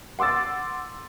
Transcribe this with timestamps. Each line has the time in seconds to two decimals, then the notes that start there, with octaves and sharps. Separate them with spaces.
0.19 F#5 C6 D6 E6 A6